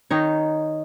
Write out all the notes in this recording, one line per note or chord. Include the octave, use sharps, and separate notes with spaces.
D#3 D#4 C#5